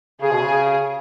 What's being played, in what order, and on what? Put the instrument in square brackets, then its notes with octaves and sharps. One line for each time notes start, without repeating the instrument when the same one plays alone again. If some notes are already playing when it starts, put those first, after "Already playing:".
[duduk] C#3 [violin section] G#4
[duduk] B2
C#3